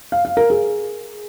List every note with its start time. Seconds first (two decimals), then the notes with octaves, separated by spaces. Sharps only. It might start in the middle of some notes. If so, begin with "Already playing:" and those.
0.12 F5
0.25 F5
0.37 A#4
0.50 G#4